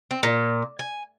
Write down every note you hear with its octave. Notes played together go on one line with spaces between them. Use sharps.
C4
A#2
G#5